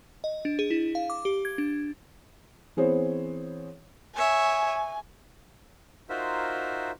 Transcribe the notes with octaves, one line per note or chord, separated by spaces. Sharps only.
D#5
D4
G#4
E4
F5
D6
G4
G#6
D4
E3 B3 C4 G#4 C5 C#5
C#5 E5 G#5
D#4 F4 F#4 A#4 C5 E5